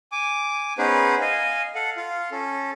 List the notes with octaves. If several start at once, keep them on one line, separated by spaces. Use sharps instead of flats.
G#5 D6
B3 C#4 D#4 G#4 B4 C5
D#5 F5 G#5
A4 F5 F#5
F4 F5
C#4 A4